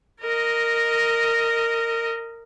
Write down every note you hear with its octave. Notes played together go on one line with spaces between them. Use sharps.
A#4 D#5